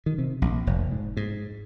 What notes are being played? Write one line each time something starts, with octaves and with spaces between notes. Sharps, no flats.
D#3
C3
A#1
F1
G#2
G#2